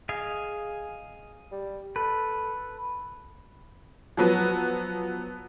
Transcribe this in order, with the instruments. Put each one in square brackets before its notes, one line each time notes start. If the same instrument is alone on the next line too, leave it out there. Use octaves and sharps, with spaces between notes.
[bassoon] G#4 [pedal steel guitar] D#5 F5 G#5
[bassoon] G3
[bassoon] A4 [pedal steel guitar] B4
[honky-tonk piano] F3 F#3 B3